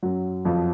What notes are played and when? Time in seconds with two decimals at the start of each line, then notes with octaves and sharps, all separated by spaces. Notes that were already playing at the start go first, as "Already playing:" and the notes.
0.03 F#2 F#3
0.45 F2 F3